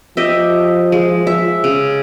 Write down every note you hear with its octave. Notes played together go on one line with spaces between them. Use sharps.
F3 G4 D#5 E5
G#3
E5
C#3